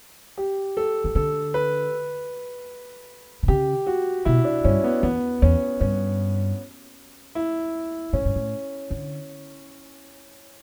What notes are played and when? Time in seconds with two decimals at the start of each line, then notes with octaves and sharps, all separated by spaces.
0.38 G4
0.77 A4
1.04 E3
1.15 D3 A4
1.54 B4
3.43 B2
3.48 C#3 G4
3.87 F#4
4.25 B2 E4
4.45 D4
4.64 G2 C#4
4.84 B3
5.03 E2 B3
5.42 E2 C#4
5.80 G2 C#4
7.35 E4
8.13 A2 C#4
8.25 G2
8.36 A2
8.91 D3